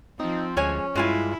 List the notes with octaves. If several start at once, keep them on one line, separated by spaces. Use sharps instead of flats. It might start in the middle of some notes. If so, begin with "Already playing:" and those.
F3 C4 D#4
D2 G#3 C#4 C#5 G#5
G2 G#3 E4 F4 G#5